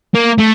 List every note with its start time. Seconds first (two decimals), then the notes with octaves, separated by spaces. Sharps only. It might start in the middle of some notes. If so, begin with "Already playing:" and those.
0.15 A#3
0.39 A3